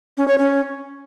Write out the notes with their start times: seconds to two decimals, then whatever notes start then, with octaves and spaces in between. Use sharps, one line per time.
0.17 C#4
0.28 C#5
0.38 C#4